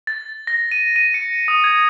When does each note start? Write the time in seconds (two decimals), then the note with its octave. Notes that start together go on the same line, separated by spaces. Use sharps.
0.07 A6
0.47 A#6
0.72 D#7
0.96 D#7
1.14 C#7
1.48 D#6
1.64 G#6